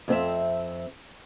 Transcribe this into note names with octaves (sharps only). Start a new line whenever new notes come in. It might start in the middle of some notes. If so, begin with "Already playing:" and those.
F2 C4 E5